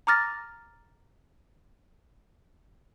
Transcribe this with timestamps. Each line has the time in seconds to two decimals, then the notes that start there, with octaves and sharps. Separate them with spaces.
0.07 A#5 D6 F6 A6 A#6